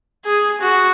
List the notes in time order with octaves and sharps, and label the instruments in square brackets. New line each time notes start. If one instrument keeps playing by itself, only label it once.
[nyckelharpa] G#4
F#4